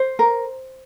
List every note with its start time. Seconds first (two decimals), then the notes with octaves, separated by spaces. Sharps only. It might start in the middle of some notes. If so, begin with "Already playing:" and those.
Already playing: C5
0.19 A#4